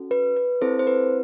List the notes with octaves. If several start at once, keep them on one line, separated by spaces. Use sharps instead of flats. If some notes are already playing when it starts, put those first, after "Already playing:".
Already playing: C#4 F#4 A4
B4
B4
C4 E4 A4 C5
C5
B4